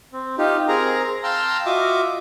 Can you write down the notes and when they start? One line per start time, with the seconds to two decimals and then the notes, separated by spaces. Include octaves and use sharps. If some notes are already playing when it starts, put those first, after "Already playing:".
0.13 C4
0.38 D#4 F4 G4
0.68 C4 G#4 A#4 A#5
1.23 F5 G5 A5 A#5 C6 E6
1.66 F4 F#4 D#5 E5 D6